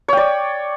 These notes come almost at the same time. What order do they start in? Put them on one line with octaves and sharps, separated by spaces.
C#5 G5 D5